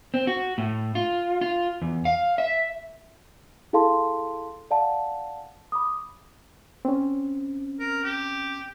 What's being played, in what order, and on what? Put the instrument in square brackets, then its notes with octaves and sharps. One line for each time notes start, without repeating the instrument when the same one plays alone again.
[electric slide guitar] C4
F#4
A2
F4
F4
E2
F5
E5
[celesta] E4 G#4 A4 F5 A5 C6
D5 F5 F#5 G#5 A5
B5 D6 D#6
[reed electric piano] C4 C#4
[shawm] A#4
G4